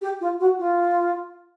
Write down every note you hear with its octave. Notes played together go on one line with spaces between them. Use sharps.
G4
F4
F#4
F4